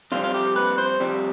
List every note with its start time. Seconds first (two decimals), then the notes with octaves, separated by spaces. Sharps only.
0.12 F2 C3 G3 C4 F4
0.24 F4
0.34 G4
0.56 B4
0.78 C5
1.00 F2 C3 G3 C4